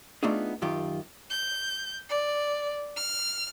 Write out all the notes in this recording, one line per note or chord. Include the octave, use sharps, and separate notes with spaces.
A3 B3 D4 D#4 F4 G#4
F#2 D#3 F4 G4
G6
D5
F6